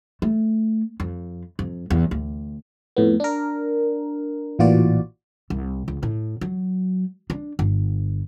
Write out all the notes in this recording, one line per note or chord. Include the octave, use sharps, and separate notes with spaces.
A3
F2
F2
E2
D2
F2 A2 B3
D4 A#4
A1 A#2 E3 F4 F#4 D5
C2
C#2
A2
F#3
D4
G1